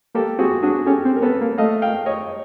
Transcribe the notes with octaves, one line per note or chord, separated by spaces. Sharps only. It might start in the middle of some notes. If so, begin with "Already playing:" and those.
A#3 G4 A4
C4 F#4 G#4
D4 F#4 G#4
C#4 G4 A4
C4
A#4
B3 A4 B4
A#3
A3 D#5 F5
F5 G5
C#5 D#5